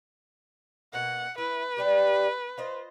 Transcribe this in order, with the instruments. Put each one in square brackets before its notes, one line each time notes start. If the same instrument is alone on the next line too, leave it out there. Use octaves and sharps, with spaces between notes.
[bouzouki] B2 A#3 [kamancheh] F#5
[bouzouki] E4 [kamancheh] B4
[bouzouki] G3 D4 G4
F4 C5 D#5